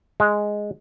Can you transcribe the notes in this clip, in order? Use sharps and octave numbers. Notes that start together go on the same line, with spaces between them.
G#3